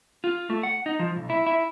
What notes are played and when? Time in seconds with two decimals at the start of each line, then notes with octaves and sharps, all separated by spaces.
0.24 F4
0.50 A3
0.63 F#5
0.86 D#4
0.99 F3
1.16 B1
1.30 E4
1.46 E4